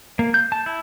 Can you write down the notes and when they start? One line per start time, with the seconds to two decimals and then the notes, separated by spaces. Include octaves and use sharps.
0.19 A#3
0.34 G6
0.52 A5
0.66 E4